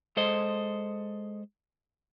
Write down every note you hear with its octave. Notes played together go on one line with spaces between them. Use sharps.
G#3 A4 C5 D#5